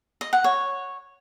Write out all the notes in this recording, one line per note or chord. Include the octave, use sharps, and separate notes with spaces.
D#5
F#5
C#5